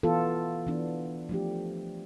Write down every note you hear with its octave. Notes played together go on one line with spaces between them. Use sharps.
E3 B3 F4 A4
E3 B3 D4
F3 A3 D4 G4